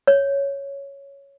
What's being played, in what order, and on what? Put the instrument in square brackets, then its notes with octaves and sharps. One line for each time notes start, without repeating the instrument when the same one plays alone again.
[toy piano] C#5